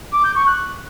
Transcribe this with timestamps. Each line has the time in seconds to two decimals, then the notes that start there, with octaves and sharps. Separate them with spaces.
0.13 D6
0.25 G6
0.36 C#6
0.47 F#6